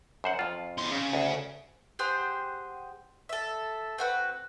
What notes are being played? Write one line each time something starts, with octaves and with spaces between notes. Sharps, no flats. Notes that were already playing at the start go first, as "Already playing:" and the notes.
F#2 C5 F#5
F2 F4
E2 C6
C#3
D2
G4 G#4 C5 F#5
A4 E5
C4 F#4 B4